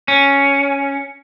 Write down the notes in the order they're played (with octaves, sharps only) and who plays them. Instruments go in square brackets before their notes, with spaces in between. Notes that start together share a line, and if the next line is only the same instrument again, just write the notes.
[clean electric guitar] C#4